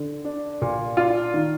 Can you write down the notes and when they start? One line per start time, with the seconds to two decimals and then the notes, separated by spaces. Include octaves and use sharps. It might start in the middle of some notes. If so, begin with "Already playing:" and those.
Already playing: D3
0.25 D4
0.62 A#2
0.97 D4 F4
1.34 D#3